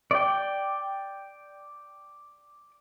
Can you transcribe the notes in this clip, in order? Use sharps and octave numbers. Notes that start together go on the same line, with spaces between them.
D5 G5